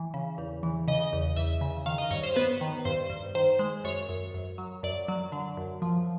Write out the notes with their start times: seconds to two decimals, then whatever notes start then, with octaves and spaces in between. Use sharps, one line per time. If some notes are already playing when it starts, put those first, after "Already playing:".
Already playing: E3
0.14 C#3
0.38 E2
0.63 E3
0.88 C#3 D#5
1.13 E2
1.37 E2 E5
1.61 C#3
1.86 D#3 F5
1.98 D#5
2.11 G2 C#5
2.23 C5
2.36 B3 B4
2.61 D#3
2.85 G2 C5
3.10 G2
3.35 D#3 C5
3.59 G#3
3.84 F#2 C#5
4.09 F#2
4.34 F#2
4.58 F#3
4.83 F#2 D5
5.08 F#3
5.32 D3
5.57 F#2
5.82 F3